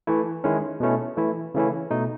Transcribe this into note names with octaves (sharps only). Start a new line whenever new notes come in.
E3 A3 E4
D#3 G#3 C#4 E4
B2 A3 C#4 E4
E3 A3 E4
C#3 E3 A3 C#4 E4
B2 A3 D#4